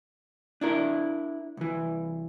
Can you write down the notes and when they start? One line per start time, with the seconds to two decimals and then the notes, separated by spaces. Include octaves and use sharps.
0.61 D4 E4 A#4
1.57 C2 E3